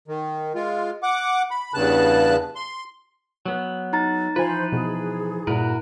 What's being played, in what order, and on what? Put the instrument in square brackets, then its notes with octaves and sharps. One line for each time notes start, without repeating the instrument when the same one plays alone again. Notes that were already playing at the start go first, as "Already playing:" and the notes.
[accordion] D#3
G#3 F4
F#5 D6
B5
E2 G2 C#3 A5 F#6
C6
[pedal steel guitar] F#3 B3
[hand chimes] D#4 A#5 A6
[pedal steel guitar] E3 F3 B4 [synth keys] F4 G#5 [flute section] C5
[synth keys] B2 [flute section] G#4
[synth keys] G2 A#2 [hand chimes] E4 [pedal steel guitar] F#4 A#4 B4